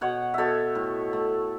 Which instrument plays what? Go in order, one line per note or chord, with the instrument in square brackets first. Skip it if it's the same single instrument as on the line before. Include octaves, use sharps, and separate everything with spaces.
[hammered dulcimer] B2 C#5 F#5
B2 A4 C#5 E5
A2
A3